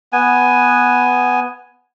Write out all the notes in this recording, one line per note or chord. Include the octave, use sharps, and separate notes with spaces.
B3 G#5